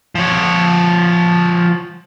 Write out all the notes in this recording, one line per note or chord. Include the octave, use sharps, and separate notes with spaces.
F3 C#5